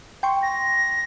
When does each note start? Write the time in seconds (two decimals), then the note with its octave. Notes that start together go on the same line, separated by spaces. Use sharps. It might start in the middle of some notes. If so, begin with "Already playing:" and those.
0.23 G5 C6 C#6
0.43 A#6